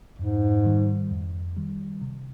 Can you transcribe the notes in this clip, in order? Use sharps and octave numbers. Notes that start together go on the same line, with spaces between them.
F2 G#2
D#3 G3
F2
D#3 G3
C3